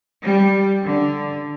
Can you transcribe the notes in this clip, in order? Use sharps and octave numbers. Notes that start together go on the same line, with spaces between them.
G3
D3